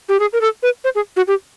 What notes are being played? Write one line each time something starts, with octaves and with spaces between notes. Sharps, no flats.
G4
G#4
A#4
A4
B4
C5
G#4
F#4
G4